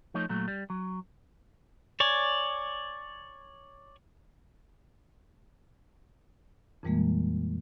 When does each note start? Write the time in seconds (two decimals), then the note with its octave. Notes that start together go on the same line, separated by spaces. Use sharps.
0.14 F3 A3 D#4 C#5
0.29 A#2 F#3 A3
0.48 G3
0.70 F#3
2.00 C#5 D5 G#5
6.83 F2 A#2 E3 G3 G#3 A#3